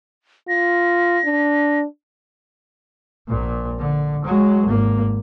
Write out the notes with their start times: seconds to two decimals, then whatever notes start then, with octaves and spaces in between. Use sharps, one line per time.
0.49 F4 A#6
1.25 D4
3.28 A#1 A#2
3.79 D3
4.25 F#3 G#3
4.67 G#1 A#3